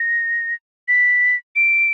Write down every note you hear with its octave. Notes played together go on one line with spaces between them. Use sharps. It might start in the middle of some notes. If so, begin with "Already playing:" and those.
Already playing: A#6
B6
D7